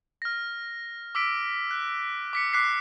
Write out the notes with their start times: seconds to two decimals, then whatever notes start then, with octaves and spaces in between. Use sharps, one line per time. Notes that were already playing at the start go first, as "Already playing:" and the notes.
0.22 F6 A#6
1.15 D6 E6 B6 D7
1.71 F#6
2.33 D6 B6 C#7
2.53 D6 F#6 B6 C7